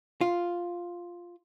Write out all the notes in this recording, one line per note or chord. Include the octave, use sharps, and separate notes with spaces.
F4